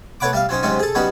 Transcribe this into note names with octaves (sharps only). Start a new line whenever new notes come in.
A3 B4 C#5 F#5 B5 D6
G3 E5 F5
F#3 C4 C#4 D#4
G#2 C3 F#3 C4 C#4 D#4
G#4 A4
F#3 G3 B3 C#4 D#4 F#4